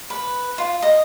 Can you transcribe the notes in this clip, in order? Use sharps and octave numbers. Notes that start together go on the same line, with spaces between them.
B4
F4
D#5